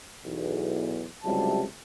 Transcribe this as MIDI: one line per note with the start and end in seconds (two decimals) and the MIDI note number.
0.24 1.07 35
0.24 1.07 40
1.24 1.64 37
1.24 1.64 48
1.24 1.64 54
1.24 1.64 55
1.24 1.64 64
1.24 1.64 81